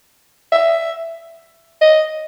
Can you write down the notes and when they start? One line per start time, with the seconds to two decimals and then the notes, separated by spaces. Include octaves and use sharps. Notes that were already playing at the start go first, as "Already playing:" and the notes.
0.52 E5
1.81 D#5